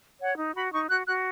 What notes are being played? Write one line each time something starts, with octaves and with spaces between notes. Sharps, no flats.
C#5 F#5
D#4
F#4 B5
D#4 C#6
F#4 F#6
F#4 F#6